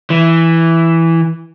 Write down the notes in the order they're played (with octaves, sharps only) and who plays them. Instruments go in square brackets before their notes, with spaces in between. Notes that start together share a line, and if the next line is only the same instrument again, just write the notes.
[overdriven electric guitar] E3